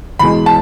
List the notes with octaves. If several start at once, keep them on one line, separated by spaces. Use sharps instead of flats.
E2 B2 G#3 B5
A5